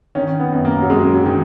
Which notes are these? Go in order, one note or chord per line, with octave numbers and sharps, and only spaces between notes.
D#3 C#4
B3
F#2
A#3
F#3
F#2 G#3
F#3
D#3